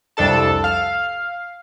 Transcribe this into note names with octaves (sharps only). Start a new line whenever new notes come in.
C2 F2 D4 A4 A5
F5